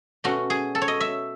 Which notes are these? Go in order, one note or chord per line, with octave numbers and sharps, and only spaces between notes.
B2 A3 C#4 F#4
G#4
A4
C#5
D#5
E5